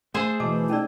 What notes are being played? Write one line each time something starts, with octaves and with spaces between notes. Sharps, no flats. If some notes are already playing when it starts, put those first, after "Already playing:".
A3 G#4 A4 C5
B2 E3 A3 D#5 A5 D6
C#4 D#4 A4 D5